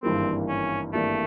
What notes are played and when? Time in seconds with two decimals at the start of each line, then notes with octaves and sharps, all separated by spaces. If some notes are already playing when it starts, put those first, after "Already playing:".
0.03 G#1 G2 E3 G3 A#3 C4
0.48 C#4
0.93 G#1 G2 E3 G3 A3 A#3